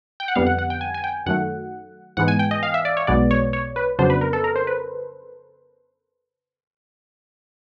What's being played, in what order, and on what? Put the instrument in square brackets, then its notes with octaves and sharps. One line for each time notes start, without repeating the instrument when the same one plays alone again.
[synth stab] G5
F#5
F2 D3 G3 B3 F5
F#5
F#5
G5
G#5
G#5
G5
F#2 D#3 F#3 A3 F#5
G#2 E3 G#3 B3 F#5
G#5
G5
D#5
F5
E5
D5
C#5
B1 B2 G#3 B3 D5
C#5
C#5
B4
F2 C#3 F#3 B3 D4 C5
B4
A#4
A4
A#4
C5
B4